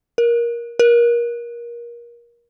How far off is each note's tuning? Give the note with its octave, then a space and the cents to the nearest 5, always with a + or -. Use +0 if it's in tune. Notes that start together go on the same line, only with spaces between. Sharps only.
A#4 +15
A#4 +25